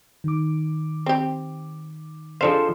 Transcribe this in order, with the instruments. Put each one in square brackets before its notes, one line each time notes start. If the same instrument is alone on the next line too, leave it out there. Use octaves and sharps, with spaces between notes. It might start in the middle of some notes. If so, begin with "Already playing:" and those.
[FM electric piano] D#3 D6
[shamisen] C4 G4
[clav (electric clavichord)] F3 A4 C5 [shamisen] G#3 D4 F5